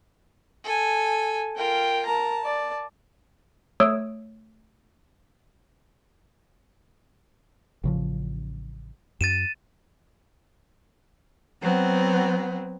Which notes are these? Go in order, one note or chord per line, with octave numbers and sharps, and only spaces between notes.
A4 G#5
F4 A#4 G5
A#4 A5 A#5
D5
A3 C#5 D#6 E6 D7
A1 C#3 F3
F#2 A6 D#7 E7
F#3 B3 C4